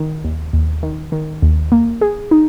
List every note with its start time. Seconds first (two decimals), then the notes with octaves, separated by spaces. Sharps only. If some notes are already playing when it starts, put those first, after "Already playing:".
Already playing: D#3
0.24 D#2
0.53 D#2
0.83 D#3
1.12 D#3
1.42 D#2
1.72 A#3
2.01 G#4
2.31 D#4